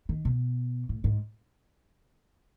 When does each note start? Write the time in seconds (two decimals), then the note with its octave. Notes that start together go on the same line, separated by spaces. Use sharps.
0.09 D#3
0.25 B2
0.89 A2
1.04 G#2